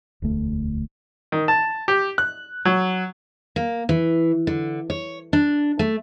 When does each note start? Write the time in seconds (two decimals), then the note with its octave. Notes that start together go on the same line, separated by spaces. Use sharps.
0.22 E1 D2 A3
1.32 D#3
1.48 A5
1.88 G4
2.18 F#6
2.65 F#3
3.56 A#3
3.89 E3
4.47 D3
4.90 C#5
5.33 D4
5.79 A3